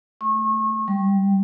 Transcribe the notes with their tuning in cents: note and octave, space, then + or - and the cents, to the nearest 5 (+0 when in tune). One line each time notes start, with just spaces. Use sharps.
A3 +0 C#6 -35
G3 +0 G5 +0